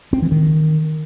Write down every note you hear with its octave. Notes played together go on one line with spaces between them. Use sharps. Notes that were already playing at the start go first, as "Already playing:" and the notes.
C4
E3
D#3